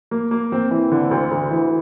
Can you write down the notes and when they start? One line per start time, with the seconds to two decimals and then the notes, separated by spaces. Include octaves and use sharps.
0.11 A#3
0.31 A#3
0.52 C4
0.71 E3
0.91 D3
1.11 D2
1.31 D2
1.51 E3